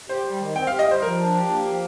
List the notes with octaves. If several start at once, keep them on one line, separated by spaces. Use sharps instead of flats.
G4 C5
G3
D#3
C4 G5
G4 F5
D#5
G3 C5
F3 A#4
D4
G4
A#3
F3